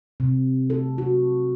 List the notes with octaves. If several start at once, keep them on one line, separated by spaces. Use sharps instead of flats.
C3
A4
F#4